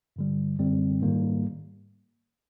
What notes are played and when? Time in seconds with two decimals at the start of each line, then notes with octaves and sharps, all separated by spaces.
0.16 G2 D3 G3
0.59 F#2 D3 G3 C4
1.02 G#2 D#3 G3 A#3